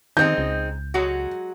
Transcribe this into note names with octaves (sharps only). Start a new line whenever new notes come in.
D#3 G#3 C4 D#4 G6
C#2
F#3 G#3 F#4